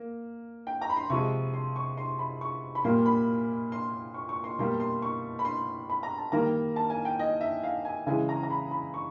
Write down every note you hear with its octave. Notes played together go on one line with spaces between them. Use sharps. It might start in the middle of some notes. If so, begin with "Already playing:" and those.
Already playing: A#3
G5
A#5
B5
C6
C3 F3 G#3 C#6
C6
C#6
C6
B5
C#6
B5
A#2 G3 A#3 C6
B5
C6
C#6
C#6
C6
B2 G3 A#3 C6
C6
C#6
B5
C6
B5
A#5
A5
D#3 G3 A#3 A#5
A5
G#5
G5
D#5
E5
F5
G#5
C#3 E3 G#3 G#5
A#5
A#5
B5
B5
C#6